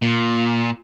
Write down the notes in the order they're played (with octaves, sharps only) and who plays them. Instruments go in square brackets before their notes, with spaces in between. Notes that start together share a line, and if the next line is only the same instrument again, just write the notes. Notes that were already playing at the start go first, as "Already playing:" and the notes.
[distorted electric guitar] A#2